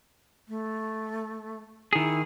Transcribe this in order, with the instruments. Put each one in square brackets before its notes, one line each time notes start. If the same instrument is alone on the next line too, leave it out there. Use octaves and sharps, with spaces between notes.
[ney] A3
[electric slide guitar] D#3 G#4 [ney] E4